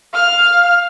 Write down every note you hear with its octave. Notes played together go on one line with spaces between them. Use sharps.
F5 F6